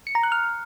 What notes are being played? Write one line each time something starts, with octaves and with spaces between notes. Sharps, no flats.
C#7
A#5
F#6
F6